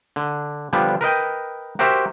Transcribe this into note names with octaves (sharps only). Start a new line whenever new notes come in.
D3
D3 F3 G3 B3 D4
A#4 B4 D#5 G5
F#4 G4 A#4 C5 E5